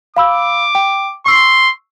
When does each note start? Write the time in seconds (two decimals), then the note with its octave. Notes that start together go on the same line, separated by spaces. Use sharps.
0.16 F5 B5 D6 E6
0.75 G5
1.26 C6 C#6 E6 C7